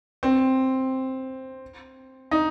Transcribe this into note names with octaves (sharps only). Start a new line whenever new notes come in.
C4
D#4